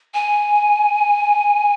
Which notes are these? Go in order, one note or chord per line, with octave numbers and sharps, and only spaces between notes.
G#5